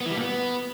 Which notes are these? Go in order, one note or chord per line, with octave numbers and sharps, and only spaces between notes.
B3
E3
G3
A#2
B3